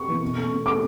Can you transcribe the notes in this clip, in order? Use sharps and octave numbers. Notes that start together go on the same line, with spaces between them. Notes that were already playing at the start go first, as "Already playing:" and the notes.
Already playing: C#6
E3 B3
B2
A3 C#4
B2
A3 C#4 D6